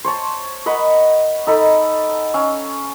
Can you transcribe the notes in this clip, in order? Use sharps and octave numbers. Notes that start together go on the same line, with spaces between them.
C5 C#5 A5
A#4 D#5 F#5 B5
D#4 A4 A#5 B5
C#4 F5 E6